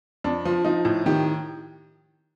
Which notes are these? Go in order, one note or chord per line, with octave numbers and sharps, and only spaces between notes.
F2 D4
F3
F3 D#4
A2
D#3 G4